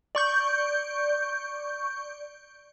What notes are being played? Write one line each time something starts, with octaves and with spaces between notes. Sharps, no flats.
D5 C#6 G6